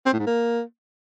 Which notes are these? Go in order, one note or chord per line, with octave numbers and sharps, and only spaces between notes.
C4
A2
G#2
A#3